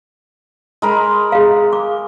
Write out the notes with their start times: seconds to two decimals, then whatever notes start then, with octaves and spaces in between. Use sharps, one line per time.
0.82 G#3 A#4 B5
1.32 G#4 F5
1.73 D6